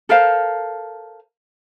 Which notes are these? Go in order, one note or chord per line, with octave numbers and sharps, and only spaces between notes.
A4 A#4 C5 F5